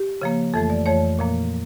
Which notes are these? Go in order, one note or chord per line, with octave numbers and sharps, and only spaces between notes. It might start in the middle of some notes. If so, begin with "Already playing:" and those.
Already playing: G4
C#3 F3 A#3
F2 E3 A3 A4
D5
F2 E3 A3 C#5
A#2 F3 A#3